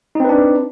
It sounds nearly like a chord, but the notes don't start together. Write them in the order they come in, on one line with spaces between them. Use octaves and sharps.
D#4 C4 B4 D4